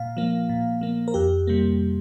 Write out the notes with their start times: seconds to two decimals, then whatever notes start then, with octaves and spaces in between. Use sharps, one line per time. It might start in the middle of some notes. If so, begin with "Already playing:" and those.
Already playing: A#2 F5
0.17 F3 A#3
0.49 A#2
0.81 F3 A#3
1.08 A#4
1.14 F2 G4
1.47 C3 G3 A#3